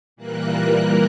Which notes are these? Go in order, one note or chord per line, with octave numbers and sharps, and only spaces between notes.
A#2 E3 G3 A#3 A#4 F#6